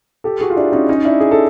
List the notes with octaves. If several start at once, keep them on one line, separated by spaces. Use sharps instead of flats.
G4 A4
F#4 G#4
F4
D4 E4
C#4 D#4
C#4 D#4
D4 E4
G#4
A4